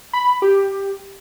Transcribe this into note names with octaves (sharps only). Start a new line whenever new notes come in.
B5
G4